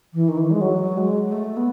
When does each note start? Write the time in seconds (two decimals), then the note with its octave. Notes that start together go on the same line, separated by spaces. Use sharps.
0.14 E3
0.29 D#3
0.37 E3
0.51 G#3
0.61 F#3
0.97 G#3
1.32 A3
1.57 B3